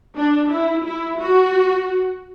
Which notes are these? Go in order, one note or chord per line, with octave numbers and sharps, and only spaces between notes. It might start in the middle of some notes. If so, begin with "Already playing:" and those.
D4
E4
E4
F#4